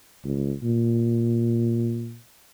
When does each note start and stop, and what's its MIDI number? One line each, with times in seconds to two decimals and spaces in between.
0.24 0.54 37
0.62 2.19 46